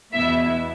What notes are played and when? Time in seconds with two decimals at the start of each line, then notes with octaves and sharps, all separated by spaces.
0.14 E2 B2 B3 E4 E5